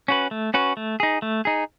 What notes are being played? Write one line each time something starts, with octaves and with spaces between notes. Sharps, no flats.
C#4 F#4 B4
A3
C#4 F#4 B4
A3
D#4 G#4
A3
D#4 G#4